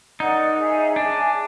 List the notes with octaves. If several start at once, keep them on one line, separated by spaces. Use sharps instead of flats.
D#4 A#4 D5 F#5
G#4 C#5 E5 G#5
D4 G#4 C#5 E5 G#5